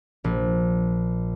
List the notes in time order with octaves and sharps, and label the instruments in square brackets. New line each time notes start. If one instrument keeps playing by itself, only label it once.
[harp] A#1